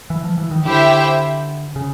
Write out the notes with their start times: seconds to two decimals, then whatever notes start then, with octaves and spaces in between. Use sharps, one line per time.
0.10 E3
0.24 F3
0.38 E3
0.51 D#3
0.65 D3 E4 G4 C5 E5 G5
1.76 C#3